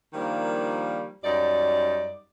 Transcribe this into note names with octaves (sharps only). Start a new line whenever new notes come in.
D#3 F3 G3 A#3 D4
F#2 G3 D#4 D5